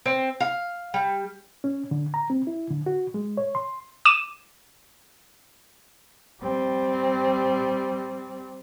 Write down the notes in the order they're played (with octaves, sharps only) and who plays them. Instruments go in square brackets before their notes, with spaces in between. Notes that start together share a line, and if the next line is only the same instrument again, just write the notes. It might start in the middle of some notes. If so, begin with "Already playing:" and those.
[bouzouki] C4
F5
G3
[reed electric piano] C#4
D3
A#5
C4
E4
D3
F#4
G#3
C#5
C6
[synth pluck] D6 D#7 E7
[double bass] G3 C4